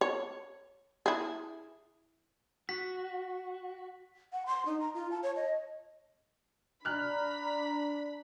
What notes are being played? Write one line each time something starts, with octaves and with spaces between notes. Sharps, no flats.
C#5
E4 G#4
F#4 B6
F#5
C6
D#4
A#5
F4
A5
C#5
D#5
D4 A#5 B5 F6 F#6